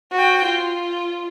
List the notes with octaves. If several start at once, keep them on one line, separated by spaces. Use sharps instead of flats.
F#4 G5
F4